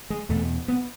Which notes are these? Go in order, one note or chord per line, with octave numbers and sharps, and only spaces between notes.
G#3
E2 B2 A3
B3